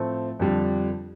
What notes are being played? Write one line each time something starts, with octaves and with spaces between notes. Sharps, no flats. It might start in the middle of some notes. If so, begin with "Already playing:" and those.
Already playing: A2 F3 A3 C4
F2 D3 G3 D4